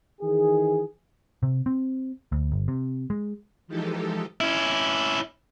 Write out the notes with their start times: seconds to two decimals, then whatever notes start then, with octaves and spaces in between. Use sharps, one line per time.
0.21 D#3 E3 G#4
1.43 C3
1.66 C4
2.32 D2
2.52 G1
2.68 C3
3.10 G#3
3.67 E3 F3 G#3 D#4 G4 A4
4.40 C#4 E4